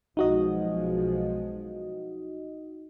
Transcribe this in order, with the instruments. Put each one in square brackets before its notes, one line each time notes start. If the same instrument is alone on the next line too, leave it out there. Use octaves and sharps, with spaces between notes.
[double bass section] B1 F3 G#3 [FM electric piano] D#4 F#4 D#5